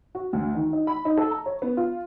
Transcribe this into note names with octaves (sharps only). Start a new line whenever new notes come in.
F#4
D2
D#3
D#4
B5
D#4
A4
A#5
C#5
B3
F4